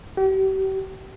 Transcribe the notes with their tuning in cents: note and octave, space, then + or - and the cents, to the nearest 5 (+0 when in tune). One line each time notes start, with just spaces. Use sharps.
G4 -40